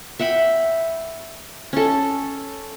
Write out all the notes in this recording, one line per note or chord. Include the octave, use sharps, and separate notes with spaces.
E5 F#5 G5 B5
C#4 A4